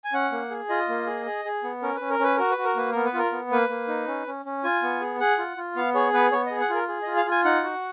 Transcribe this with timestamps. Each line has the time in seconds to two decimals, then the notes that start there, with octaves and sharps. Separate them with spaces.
0.04 G#5
0.13 C#4 F#5
0.32 A#3
0.50 G#4
0.69 F4 D#5
0.89 A#3
1.07 G#4
1.26 G#4
1.45 G#4
1.64 B3
1.82 C#4 A#4
1.96 C#4 B4
2.10 A#4
2.19 C#4 B4
2.37 F#4 A#4
2.51 B4
2.58 F#4
2.64 A#4
2.76 A#3 B4
2.91 B3 A#4
3.05 B4
3.14 F4 A#4
3.32 B3
3.51 A#3 B4
3.69 A#3
3.88 D#4
4.08 C#4
4.27 C#4
4.45 C#4
4.64 F4 G#5
4.82 B3
5.01 G#4
5.20 G#4 F#5
5.39 F4
5.57 F4
5.76 B3 F5
5.94 G#4 C#5
6.14 B3 B4
6.32 B3 C#5
6.46 G#4 D#5
6.61 F#5
6.70 F4
6.75 A#4
6.88 G#4
7.03 F4 D#5
7.17 F5
7.26 F4
7.31 G#5
7.45 D#4 F#5
7.64 F#4